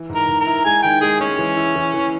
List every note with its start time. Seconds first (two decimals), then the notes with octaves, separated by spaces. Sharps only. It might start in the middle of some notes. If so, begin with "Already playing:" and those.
Already playing: E3
0.09 G#2
0.15 A#4
0.28 G#2
0.40 A#4
0.46 E4
0.65 G#3 G#5
0.83 D#3 G5
1.01 G#3 G#4
1.20 G#3 C#4
1.39 E3
1.57 E4
1.75 E3
1.94 E3